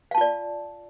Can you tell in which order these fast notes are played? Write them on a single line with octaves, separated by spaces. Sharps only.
F5 A5 F4 D5